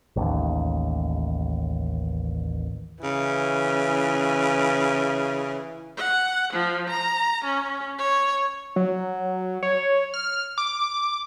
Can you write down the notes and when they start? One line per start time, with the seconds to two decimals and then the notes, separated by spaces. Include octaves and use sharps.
0.16 A1 D#2
3.03 C#3 E3
5.97 F#5
6.53 F3
6.89 A#5
7.44 C#4
7.98 C#5
8.76 F#3
9.63 C#5
10.14 F6
10.58 D6